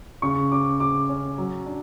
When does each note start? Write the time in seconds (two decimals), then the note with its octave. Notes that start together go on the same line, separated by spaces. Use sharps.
0.22 C#3 C#6
0.51 C#4 D6
0.80 C#3 D6
1.09 C#4
1.38 F#3
1.66 D4